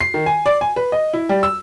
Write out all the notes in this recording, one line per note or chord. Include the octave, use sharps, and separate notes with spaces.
C7
D#3
G#5
D5
G#5
B4
D#5
E4
G3
E6